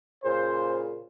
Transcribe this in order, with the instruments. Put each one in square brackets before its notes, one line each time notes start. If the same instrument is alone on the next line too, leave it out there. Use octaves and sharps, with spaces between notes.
[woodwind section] A#2 C#3 [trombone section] C5